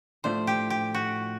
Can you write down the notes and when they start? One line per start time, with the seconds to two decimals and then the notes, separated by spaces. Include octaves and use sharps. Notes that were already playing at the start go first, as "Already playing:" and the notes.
0.24 A2 F3 A3 D4 C5
0.47 G4
0.70 G4
0.94 F#4